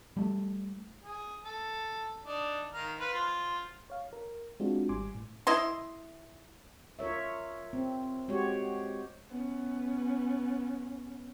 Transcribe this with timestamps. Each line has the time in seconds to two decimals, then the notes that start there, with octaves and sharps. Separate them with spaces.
0.17 G3 A3
1.03 G#4
1.45 A4
2.24 D4 D#4
2.74 D#3 F5 A#5
3.00 B4 C5 F5
3.13 F4 C5
3.90 C#5 F5
4.13 A#4
4.60 G#3 C4 D4 F4 F#4
4.89 G#1 G3 G#5 C6 D6
5.15 A2
5.47 E4 D#5 C6
6.99 F4 A#4 C#5 E5
7.73 C4
8.28 G#3 F#4 G4 C5 C#5
9.29 B3 C#4